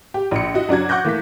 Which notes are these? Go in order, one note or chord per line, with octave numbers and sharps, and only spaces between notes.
G4
A#1 C#7
E4 F#4 D#5
F#2 D4 F#4 G#6
F#5 C#6 D6 F#6 G6 A#6
E3 A3 A#3 B6